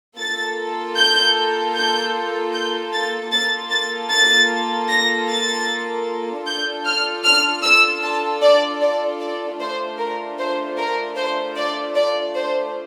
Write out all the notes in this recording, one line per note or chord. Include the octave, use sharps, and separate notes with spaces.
A#3 F4 A4 A6
G6
G6
G6
A6
A#3 F4 A4 A6
A6
A6
A#6
A6
D4 F4 A4 G6
F6
F6
E6
A5
D5
D5
D5
A3 D4 F4 C5
A#4
C5
A#4
C5
D5
D5
C5